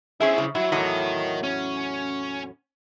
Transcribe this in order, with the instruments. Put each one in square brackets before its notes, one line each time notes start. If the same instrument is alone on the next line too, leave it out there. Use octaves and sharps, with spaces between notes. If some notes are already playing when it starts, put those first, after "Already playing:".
[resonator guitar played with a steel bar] C#4 G#4 E5 [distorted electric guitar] E4 C5
[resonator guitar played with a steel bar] C#3
[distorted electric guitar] F#3 [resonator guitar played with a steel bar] E4
[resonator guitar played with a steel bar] E2 A2 F#3 [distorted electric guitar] A#4 D#5
[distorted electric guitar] C#4